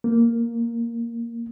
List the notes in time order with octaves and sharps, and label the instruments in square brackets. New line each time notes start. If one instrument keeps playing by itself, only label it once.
[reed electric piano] A#3